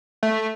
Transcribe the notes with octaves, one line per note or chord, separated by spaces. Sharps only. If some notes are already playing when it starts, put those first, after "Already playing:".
A3